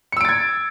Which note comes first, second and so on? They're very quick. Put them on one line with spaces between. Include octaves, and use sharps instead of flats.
C#7 E6 D7 A6 G#6